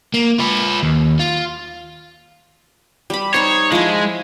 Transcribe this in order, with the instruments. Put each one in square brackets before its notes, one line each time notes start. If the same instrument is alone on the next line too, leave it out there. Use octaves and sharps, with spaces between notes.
[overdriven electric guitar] A#3
F4 B4
D#2
F4
[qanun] G3 B5
[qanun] D#4 C5 [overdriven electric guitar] C#5
[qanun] F3 E4 [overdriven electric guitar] G#3